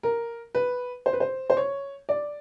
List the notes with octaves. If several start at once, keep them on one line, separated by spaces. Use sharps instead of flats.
A#4
B4
C5
B4
C5
C5
C#5
D5